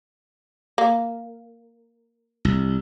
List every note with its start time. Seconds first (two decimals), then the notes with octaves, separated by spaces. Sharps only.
0.78 A#3
2.45 C2